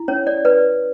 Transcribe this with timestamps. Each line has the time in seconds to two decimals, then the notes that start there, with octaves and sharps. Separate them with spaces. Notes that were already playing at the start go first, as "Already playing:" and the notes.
Already playing: E4
0.08 C#4 C#5
0.27 D5
0.45 B4 D5